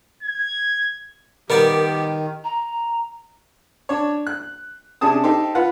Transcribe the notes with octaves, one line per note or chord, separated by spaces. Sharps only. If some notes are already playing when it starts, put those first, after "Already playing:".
G#6
D#3 G3 B3 G4 A#4 D5
A#5
D4 C#5
F#6
C3 C#4 D4 G#4 A5 D#6
D#4 G4 A4 C5
F4 B4 F#5